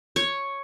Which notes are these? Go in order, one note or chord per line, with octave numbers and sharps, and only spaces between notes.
C#5